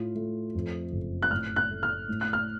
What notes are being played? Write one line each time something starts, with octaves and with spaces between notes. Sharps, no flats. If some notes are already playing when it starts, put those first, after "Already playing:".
Already playing: A2 F4
A3
F2
F#1
F#6
A2 F6
F#6
A3
F6
A2
F#6
F6